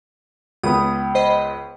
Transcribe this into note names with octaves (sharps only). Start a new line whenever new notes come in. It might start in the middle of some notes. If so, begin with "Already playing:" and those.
C#2 B3 D#6
C5 D#5 B5